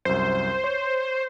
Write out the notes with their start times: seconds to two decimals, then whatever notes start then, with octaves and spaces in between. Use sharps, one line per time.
0.05 C2 F#2 C5
0.64 C#5